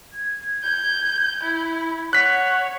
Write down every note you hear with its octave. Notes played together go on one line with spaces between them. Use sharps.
G#6
G6
E4
C#5 F#5 F#6 B6